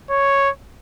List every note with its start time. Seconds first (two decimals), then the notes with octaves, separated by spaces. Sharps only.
0.10 C#5